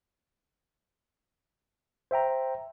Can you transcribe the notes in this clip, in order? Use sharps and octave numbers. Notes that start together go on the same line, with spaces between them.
C5 E5 G5 A#5